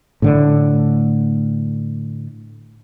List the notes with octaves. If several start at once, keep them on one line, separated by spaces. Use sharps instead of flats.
A2 D3 A3